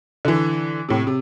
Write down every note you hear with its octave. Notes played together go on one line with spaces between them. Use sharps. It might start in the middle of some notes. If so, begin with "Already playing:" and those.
D3 E3
A2 C3
C3